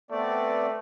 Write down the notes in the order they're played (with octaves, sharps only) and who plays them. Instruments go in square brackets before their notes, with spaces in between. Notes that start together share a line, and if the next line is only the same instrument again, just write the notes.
[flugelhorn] A3 [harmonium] B3 C4 D5